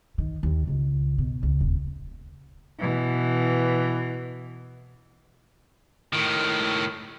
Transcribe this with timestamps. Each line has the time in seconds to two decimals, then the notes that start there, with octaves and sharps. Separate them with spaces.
0.18 D#3
0.43 D#2
0.67 C#2
1.18 B2
1.43 C#2
1.61 D#1
2.79 B2 E3
6.13 A2 D#3